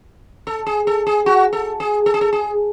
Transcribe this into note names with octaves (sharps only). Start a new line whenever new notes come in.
A4
G#4
A4
G#4
F#4
A4
G#4
A4
G#4
A4
G#4